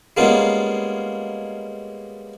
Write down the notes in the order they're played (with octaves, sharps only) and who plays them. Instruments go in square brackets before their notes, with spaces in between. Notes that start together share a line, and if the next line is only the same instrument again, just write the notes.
[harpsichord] G3 G#3 A#3 B3 C#4 F4